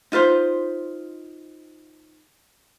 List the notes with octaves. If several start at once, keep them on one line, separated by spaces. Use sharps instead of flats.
D#4 F4 B4 C5